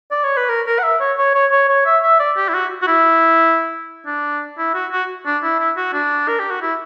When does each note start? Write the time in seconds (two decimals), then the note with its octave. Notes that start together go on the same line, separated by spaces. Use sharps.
0.11 D5
0.24 C#5
0.37 B4
0.49 A#4
0.66 A#4
0.79 F#5
0.83 E5
1.00 C#5
1.18 C#5
1.34 C#5
1.52 C#5
1.69 C#5
1.85 E5
2.03 E5
2.19 D5
2.37 G4
2.49 E4
2.54 F#4
2.82 F#4
2.87 E4
4.06 D4
4.58 E4
4.74 F#4
4.91 F#4
5.26 D4
5.43 E4
5.59 E4
5.77 F#4
5.93 D4
6.28 A#4
6.39 G4
6.51 F#4
6.62 E4